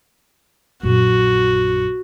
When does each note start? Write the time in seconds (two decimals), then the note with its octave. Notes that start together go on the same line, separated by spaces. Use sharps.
0.83 A#1 F#2 F#4